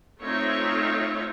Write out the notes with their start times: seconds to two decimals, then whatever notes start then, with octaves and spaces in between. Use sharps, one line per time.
0.19 A3 C4 D#4 F4 C#5 E5